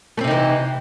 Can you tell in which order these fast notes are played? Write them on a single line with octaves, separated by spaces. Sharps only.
A3 C4 C3 D#4 E3